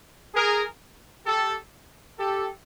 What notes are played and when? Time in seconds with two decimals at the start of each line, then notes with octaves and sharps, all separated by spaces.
0.34 G#4 A#4
1.25 G4 A4
2.18 G4 A4